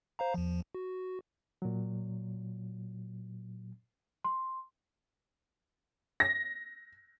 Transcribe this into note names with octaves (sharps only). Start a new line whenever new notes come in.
C5 F5 A#5
E2 F3
F#4
A#2 F#3
C6
A#6